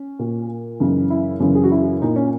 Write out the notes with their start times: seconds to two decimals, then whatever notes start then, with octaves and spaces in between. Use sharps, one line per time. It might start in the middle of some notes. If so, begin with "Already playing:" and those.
Already playing: C#4
0.19 A#2
0.80 F#2 C#3 E3 D#4
1.10 E4
1.40 F#2 C#3 E3
1.55 G#4
1.64 F#4
1.72 E4
2.02 A#2 D#4
2.16 C#4